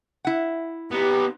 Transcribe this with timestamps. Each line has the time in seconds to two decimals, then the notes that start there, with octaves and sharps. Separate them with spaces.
0.25 E4 F#5
0.91 B3 D#4 G4